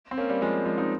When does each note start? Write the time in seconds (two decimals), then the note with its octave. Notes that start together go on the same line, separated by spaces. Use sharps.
0.11 C4
0.17 A#3 C#4
0.29 G3 A#3
0.42 F3 G#3
0.66 F3 G#3
0.78 C4 D#4